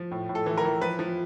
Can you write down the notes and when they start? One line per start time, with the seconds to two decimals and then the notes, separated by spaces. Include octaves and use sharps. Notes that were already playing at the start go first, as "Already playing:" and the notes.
Already playing: F3
0.11 A2
0.29 A2
0.35 A4
0.46 E3
0.58 A#4
0.64 E3
0.81 F3 B4
0.99 F3